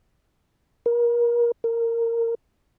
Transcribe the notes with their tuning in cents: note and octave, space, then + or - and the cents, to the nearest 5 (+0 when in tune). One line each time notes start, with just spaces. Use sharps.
A#4 +30
A#4 -15